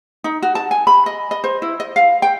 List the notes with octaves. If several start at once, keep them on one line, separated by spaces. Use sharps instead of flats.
D#4
F#4
A5
G#5
B5
D#5
D#5
C5
E4
D#5
F5
G5